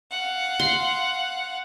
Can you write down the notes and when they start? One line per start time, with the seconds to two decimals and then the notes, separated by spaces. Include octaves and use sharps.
0.12 F5 F#5
0.60 C6